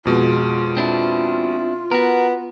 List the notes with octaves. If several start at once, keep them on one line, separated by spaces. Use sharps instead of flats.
F2 B2 G#3 F4
C4 D4 E4
B3 F#4 A#4